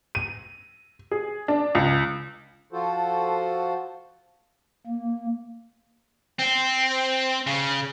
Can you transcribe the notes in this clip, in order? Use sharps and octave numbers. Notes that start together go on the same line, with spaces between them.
D#7
G#4
D4
C#2
F3 F4 F#4 A4 C5
A#3
C4
C#3